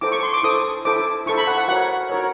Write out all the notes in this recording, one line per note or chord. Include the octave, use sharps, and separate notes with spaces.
E4 A4 C5 D6
C#6
C6
D6
E4 A4 C5 D#6
E4 A4 C5 D6
E4 A4 C5 C#6
B5
F#5
F#5
F#4 A#4 C#5 F#5
F#4 A#4 C#5